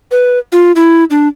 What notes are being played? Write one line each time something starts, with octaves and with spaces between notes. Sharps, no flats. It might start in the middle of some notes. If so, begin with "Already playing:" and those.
B4
F4
E4
D4